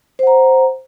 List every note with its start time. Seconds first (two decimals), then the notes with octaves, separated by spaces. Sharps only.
0.19 C5
0.23 F#5
0.27 A#5